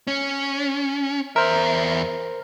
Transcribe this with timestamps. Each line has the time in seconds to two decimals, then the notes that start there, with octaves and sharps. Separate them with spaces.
0.07 C#4
1.36 E2 A#4 C5 E5